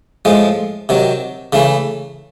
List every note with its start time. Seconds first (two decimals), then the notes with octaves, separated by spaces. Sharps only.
0.25 A2 F3 G#3
0.89 C3 D#3 F#3
1.53 C#3 E3 A3